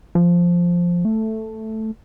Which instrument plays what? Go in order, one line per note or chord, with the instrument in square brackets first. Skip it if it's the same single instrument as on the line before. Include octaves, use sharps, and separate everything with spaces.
[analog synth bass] F3
A3